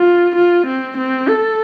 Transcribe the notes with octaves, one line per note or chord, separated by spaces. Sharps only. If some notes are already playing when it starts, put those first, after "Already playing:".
Already playing: F4
F4
C4
C4
A4